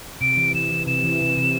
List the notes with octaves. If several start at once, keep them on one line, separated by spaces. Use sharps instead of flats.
C3 D7
E3
E3 E7
E3
C3 E7
E3
C3
C3